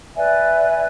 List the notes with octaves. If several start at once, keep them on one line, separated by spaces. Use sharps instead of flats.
B4 D5 E5 G#5